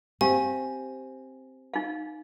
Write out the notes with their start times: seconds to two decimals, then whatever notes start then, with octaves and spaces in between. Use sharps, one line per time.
0.21 C4 G4 F5 G#5
1.74 D#4 F5